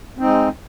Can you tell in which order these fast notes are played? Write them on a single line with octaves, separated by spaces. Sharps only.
C4 D#4 G#3